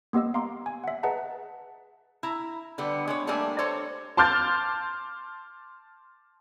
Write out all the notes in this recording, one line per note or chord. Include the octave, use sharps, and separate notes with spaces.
A#3 B3 G4 D#5 E6
F5 A#5 C6 D6
G#5
E5 F#5
G#4 B4 D#5 F#5 A5 A#5
E4 A#5
D3 G3 B3
G#3 B3 C#5
G3 A3 A#3 D4 G#5
A4 C5 C#5
A5 C6 D6 F6 G6 A6